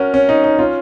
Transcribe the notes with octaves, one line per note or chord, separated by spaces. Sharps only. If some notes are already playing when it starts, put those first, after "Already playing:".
Already playing: C#4 F#4 A#4
C#4
D#4
D#4
C#4 F4